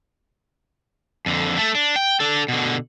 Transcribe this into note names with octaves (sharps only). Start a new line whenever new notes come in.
F2 D3
A3 A4
D4
G5
D4 A4
B2 D3